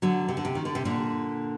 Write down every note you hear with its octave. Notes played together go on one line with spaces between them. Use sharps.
D3 F#3
C3
D3
C3
D#3
D3
C3
A#2 D3